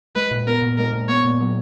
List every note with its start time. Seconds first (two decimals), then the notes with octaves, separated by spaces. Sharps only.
0.16 G#3 B4
0.31 A#2
0.47 B3 A#4
0.62 A#2
0.77 G#3 A#4
0.93 A#2
1.08 B3 C#5
1.24 A#2
1.40 F#3